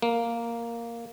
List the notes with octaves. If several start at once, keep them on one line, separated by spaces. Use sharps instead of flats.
A#3